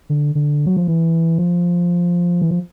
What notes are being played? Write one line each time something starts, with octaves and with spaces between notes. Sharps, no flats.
D3
D3
F#3
F3
E3
F3
E3
F3